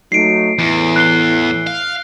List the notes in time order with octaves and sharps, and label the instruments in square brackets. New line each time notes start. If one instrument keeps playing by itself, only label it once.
[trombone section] F#3 A3 D#4 [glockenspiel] C7 D7
[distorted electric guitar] E2 [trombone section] A2 E3
[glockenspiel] F#6 C7 G7
[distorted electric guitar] F5